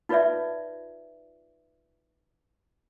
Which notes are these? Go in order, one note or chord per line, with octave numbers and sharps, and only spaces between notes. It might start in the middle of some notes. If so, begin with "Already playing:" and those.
D#4 F4 B4 C#5 D5 E5